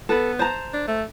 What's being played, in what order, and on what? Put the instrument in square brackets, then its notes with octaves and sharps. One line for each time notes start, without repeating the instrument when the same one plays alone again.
[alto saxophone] B3 [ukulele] A4 B4
[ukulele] C5 A5 A#5
[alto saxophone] D4
A3